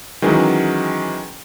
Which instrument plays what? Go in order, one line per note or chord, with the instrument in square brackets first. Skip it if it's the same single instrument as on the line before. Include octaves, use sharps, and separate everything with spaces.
[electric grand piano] D#3 E3 F#3 G#3 C#4